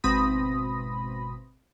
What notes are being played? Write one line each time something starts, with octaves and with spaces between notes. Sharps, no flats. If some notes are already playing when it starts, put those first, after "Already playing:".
G#1 B2 C4 B5 D#6 A#6